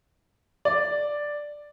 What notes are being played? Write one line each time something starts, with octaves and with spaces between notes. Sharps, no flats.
D5